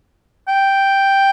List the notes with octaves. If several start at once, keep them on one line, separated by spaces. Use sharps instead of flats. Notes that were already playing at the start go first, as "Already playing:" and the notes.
G5